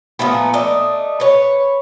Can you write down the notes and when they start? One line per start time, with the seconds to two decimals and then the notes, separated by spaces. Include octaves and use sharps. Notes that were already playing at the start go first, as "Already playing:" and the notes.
0.19 A#2 F3 A3 B3
0.53 A3 D4 D#5
1.20 B4 C#5